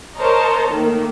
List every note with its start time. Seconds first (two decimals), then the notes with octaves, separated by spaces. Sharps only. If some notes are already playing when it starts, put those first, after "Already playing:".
0.19 A#4 C5 C#5 D#5 A5 A#5
0.70 D#3 A3 A#3